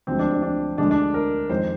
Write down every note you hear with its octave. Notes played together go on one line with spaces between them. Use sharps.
D2 D3 F3 G#3 C4
D4
D4
D4
D2 D3 G#3 D4
D4
A#4
F2 D#3 G#3 C5